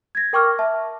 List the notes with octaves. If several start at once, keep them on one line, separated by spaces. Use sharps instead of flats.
G#6 A#6
A#4 G5 C#6 D6 F6
E5 A5